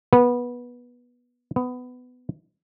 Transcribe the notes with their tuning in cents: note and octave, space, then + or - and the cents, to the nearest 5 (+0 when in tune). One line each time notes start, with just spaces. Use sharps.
B3 -20
B3 +15